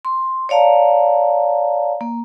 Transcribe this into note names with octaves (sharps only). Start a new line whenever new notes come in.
C6
C#5 D5 F5 A5 A#5
A#3